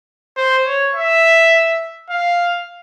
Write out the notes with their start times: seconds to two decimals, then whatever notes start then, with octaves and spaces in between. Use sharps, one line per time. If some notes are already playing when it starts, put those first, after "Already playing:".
0.37 C5
0.66 C#5
0.94 E5
2.10 F5